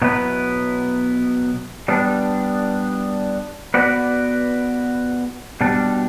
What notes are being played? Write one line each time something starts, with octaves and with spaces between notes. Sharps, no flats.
B2 F#3 B3 E4 B4
G3 B3 D4
B3 F#4 B4 D5
B2 G3 D4